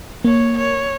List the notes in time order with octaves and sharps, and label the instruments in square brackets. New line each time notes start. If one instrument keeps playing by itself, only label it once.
[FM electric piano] A#3 [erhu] C#5
[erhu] C#5